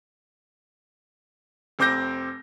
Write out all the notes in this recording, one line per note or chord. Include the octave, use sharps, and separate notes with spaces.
F1 C4 D6 G6 A#6